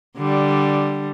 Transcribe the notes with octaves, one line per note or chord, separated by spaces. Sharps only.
D3 G3